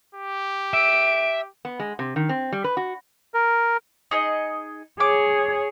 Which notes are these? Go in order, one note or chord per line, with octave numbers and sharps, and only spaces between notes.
G4
E5 D7
B3
G#3
C3
D#3
C4
G3
B4
F#4
A#4
D#4 G#4 D#5
G#4 C#5 D6